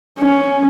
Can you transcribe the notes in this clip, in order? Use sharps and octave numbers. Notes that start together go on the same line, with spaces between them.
C#4